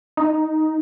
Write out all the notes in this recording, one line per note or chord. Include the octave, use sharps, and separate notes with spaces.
D#4